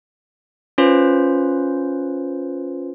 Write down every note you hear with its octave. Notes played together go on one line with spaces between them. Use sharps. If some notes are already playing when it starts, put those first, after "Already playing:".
C#4 F4 B4 C5